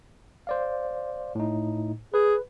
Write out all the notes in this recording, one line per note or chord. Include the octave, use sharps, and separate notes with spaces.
C5 D5 F5
A2 D#4
G#4 B4